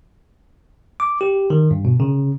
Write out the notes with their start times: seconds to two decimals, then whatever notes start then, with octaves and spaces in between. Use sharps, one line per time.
1.00 D6
1.21 G4
1.50 D#3
1.71 G2
1.85 B2
2.00 C#3